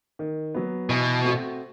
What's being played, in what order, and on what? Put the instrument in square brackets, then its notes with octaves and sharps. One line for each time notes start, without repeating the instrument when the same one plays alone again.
[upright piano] D#3
F#3 B3
[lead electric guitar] B2 [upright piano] E3
[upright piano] A3 C4 F#4